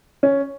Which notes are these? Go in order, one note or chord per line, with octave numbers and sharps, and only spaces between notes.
C#4